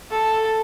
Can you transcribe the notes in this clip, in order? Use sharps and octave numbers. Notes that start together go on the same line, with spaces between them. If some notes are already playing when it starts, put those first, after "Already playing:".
A4